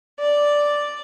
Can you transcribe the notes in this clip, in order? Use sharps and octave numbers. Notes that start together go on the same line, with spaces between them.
D5